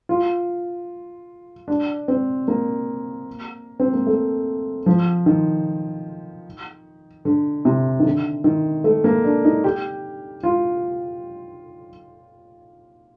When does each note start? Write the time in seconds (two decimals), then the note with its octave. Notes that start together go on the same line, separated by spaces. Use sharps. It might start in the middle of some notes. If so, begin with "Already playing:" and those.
0.09 F4
1.68 D4
2.08 C4
2.48 A#3
3.80 C4
3.93 A#3
4.07 A3
4.86 F3
5.26 D#3
7.25 D3
7.65 C3
7.99 D#3
8.05 D3
8.44 D#3
8.84 A3
9.04 A#3
9.24 D4
9.45 D#4
9.64 G4
10.43 F4